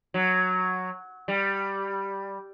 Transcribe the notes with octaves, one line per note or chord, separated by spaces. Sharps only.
F#3
G3